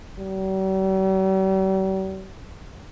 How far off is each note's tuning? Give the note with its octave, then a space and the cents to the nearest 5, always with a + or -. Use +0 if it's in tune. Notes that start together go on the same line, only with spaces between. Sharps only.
G3 -45